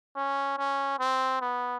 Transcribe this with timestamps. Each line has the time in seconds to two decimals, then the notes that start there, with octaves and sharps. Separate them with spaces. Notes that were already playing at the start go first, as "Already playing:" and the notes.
0.16 C#4
0.58 C#4
0.99 C4
1.41 B3